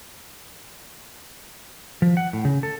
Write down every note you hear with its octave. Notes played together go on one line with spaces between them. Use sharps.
F3
F#5
A2
C#3
A4